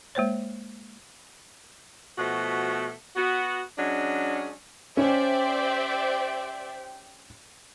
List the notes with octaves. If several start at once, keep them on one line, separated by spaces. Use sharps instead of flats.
G#3 A#3 C5 C#5
B2 F3 A3 F#4
B3 F#4
F#3 G#3 C#4 D4
C#4 G4 C5 D5 E5 G5